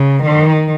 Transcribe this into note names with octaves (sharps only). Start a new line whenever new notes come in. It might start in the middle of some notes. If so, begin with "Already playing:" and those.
Already playing: C#3
D#3